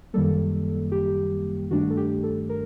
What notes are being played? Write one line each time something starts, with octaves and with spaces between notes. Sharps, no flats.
F#2 D#3 G3 A#3 A4
G4
G2 D#3 A3 D4 F#4
A4
G4
A4
A#4